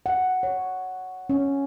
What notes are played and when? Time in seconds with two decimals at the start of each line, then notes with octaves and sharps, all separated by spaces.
0.06 F#5
0.43 C#5
1.30 C#4